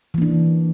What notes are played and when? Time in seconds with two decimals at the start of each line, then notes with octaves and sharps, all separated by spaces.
0.14 E3
0.18 A#3
0.22 D4